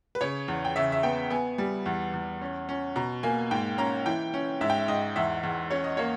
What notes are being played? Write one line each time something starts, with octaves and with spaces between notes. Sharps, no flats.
B4
C#3 C#5
E2
G5
C#3 E5
E5
B3 G5
B3 G#5
G3
E2
E2
C#4
C#4
B2 A#5
A#3 G#5
G#2 G5
C#4 A#5
E3 G5
C#4
G#2 E5
G5
E5
G#2 D#5
E2 E5
E2
C#4 C#5
D#5
A#3 C#5